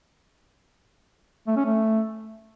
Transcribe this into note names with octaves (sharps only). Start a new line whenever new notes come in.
A3
C#4
A3